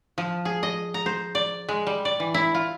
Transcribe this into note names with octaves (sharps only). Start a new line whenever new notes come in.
F3
G#4
D#5
A#5
C5
D5
G#3
G3
D5
E3
E4
F4